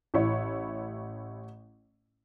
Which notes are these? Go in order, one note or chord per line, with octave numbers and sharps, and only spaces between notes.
A1 E4 C#5